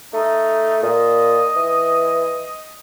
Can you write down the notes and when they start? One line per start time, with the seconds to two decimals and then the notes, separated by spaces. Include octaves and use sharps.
0.13 A3 D#4
0.82 A#2 D#5
1.56 E3